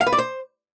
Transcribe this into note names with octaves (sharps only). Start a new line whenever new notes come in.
F5
B4
D5
C5